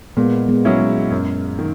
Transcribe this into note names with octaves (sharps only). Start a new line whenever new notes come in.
A#2 G#3 B3
G#3 B3
F#3 C#4 E4
G#3
F#2
D#3